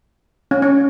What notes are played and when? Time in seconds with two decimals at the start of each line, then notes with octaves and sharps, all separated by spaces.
0.51 C#4
0.62 C#4